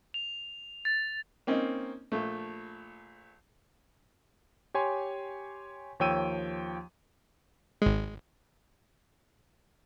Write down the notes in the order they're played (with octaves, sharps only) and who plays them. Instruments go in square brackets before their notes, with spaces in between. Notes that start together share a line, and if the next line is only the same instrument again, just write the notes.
[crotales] F7
A6
[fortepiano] A#3 C4 C#4 D#4
A#1 A3
[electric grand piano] G4 C#5 G#5 C6
D#2 F3 C#5 G5 E6 D#7
[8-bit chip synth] G#1 G#3